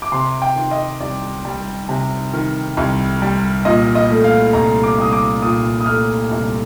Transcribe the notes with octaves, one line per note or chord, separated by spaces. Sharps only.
D6
C3 C6
G5
D#3
D#5
C2 D5
G3
C3
D#3
C2
G3
A#2 D#5
D#5
A3
F5
C2 A#5
D6
C2 D#6
D6
A#2 D#6
D#6
A3 F6
C2